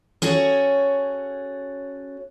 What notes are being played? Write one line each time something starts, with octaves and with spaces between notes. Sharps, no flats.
C#4 F#4 G#4 A4 C#5